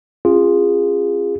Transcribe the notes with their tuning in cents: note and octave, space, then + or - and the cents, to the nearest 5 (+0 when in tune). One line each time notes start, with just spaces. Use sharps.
C#4 -30 F4 +0 G#4 -20